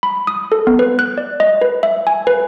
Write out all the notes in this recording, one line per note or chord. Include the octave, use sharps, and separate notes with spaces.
B5
D#6
A4
B3
B4
F#6
D5
D#5
B4
E5
G#5
B4